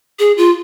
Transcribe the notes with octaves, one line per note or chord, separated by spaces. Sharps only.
G#4
F4